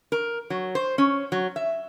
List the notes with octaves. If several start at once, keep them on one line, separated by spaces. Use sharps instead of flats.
A#4
F#3
C5
C#4
F#3
E5